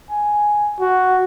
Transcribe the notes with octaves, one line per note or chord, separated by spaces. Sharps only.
G#5
F#4